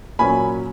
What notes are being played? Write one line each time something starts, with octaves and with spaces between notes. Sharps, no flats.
A#2 F#3 C#4 G#5 B5